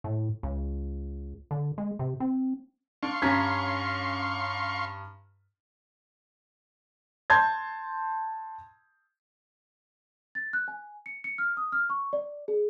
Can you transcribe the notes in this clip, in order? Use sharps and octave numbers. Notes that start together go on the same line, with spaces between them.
A2
C#2
D3
G#3
C3
C4
D4 F5 C6 C#6
G2 C#4 A#5 F6 G#6 B6
A5 C6 G6 G#6
A6
F#6
G#5
C#7
C#7
F6
D#6
F6
C#6
D5
G#4